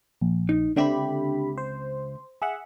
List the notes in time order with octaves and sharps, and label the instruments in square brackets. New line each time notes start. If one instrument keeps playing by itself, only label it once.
[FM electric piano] A#1
[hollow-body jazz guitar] D#4
[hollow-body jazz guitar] C#2 C4 E5 [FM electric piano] D3 G4 B5
[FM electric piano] C5
G#4 E5 F#5